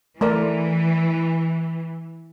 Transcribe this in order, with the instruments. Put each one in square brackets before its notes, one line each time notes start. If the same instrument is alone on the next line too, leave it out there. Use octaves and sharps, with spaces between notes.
[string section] E3 [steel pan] A3 A#4 D5